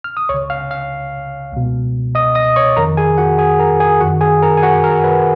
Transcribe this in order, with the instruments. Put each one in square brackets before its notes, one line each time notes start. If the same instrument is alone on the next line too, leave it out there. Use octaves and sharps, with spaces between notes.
[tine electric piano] F6
D#6
C#2 C#3 C#5 C#6
F5 F6
F5 F6
C#2 B2
D#5 D#6
D#5 D#6
C#5 C#6
F2 D#3 A#4 A#5
G#4 G#5
F#4 F#5
G#4 G#5
A#4 A#5
G#4 G#5
F#2 D#3 F#4 F#5
G#4 G#5
A#4 A#5
G#5
F#4 F#5
A#4
B4